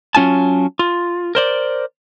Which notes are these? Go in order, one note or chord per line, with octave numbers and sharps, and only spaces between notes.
F#3 C#4 F4 G#5 A5
F4
A#4 C5 D5